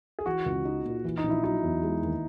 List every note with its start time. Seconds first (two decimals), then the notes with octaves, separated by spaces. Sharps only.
0.19 G#4
0.26 E3 F#4
0.46 C#2
0.65 D#4
0.85 A#2
1.04 E3
1.18 D#4
1.24 A#1
1.30 E4
1.44 F#3 D#4
1.63 E2
1.83 G#3
2.03 D#2